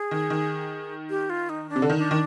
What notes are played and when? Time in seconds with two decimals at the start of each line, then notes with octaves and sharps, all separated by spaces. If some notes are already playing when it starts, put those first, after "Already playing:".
Already playing: G#4
0.11 D#3
0.30 D#3
1.10 G4
1.30 F4
1.49 D#4
1.69 D4
1.76 C3
1.82 D3
1.90 D#3
1.97 D4
2.11 D#3